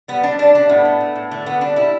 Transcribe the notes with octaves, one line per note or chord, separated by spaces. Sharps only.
G3 B3
G3 D4
G3 D4
G3 D4
A2 B3
A3
A3
A2
D3 A3
D3 B3
G3 D4
G3 E4